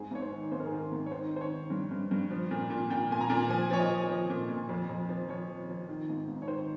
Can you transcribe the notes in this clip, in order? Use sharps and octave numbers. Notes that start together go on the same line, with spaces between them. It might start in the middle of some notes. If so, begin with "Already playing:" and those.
Already playing: G#2 G#4
G#2 C#5
C5
D#3
G#2 C5
A#4
G#4
D#3 A#4
G#2
C#5
D#3 C5
D#3
C5
C#5
D#3
G2
G2
G2
F3
A#2
A#2
A#2 G5
A#2 G#5
A#5
A#2
F3 G#5
F3 C#5
D#5
F3
F3
A#2
A#2
F2
F2
F3
F3 C#5
F3
F3
D#3
G#2
G#2
C#5
D#3 C5